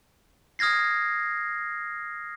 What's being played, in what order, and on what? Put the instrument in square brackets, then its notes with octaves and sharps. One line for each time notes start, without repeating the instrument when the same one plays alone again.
[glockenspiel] D#6 F6 G#6 A#6 C7